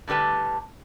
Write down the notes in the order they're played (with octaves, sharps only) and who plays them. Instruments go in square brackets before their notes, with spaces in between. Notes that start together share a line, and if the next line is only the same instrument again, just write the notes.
[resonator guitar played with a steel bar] A2 D3 G3 B4 A5